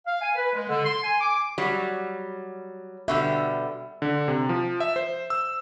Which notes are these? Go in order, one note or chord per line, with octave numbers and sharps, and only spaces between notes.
F5
G#5
B4
G#3
D3
C6
G#5
D6
F#3 G3
B2 D3 G3 E5
D3
C3
F3
E5
C5
E6